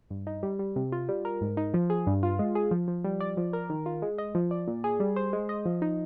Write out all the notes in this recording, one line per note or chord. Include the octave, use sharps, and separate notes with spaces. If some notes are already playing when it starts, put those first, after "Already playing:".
G2
D#4
G3
G3
C3
F4
G3
A#4
G#2
D#4
F3
G#4
G2
F4
G#3
G#4
F3
F3
G3
D5
F3
A#4
D#3
F4
G#3
D#5
F3
D5
A#2
G#4
G3
C5
G#3
D#5
F3
D#4